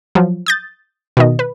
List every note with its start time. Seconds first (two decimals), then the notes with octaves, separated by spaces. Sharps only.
0.15 F3 F#3
0.46 D#6 G6 A6
1.17 B2 D#3 D#5
1.39 B4